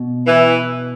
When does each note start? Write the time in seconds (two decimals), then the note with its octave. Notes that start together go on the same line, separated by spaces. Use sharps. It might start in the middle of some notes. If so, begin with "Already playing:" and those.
Already playing: B2
0.27 E3